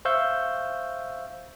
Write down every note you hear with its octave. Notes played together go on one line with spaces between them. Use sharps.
C5 E5 F5 C#6 E6 G6